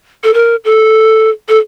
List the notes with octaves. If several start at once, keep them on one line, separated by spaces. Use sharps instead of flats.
A4
A#4
A4
A4